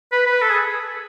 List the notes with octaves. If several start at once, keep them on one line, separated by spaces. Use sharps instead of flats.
B4
B4
A4
G#4